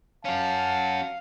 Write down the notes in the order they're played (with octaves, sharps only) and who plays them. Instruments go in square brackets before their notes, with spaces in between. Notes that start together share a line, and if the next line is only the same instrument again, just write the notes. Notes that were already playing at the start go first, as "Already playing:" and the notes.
[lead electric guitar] C#4 F#4 [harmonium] F5 [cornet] A5